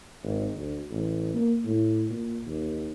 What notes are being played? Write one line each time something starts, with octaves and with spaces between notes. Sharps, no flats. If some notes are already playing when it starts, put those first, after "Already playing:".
G#1
D2
A1
A#3
A2
A#2
D#2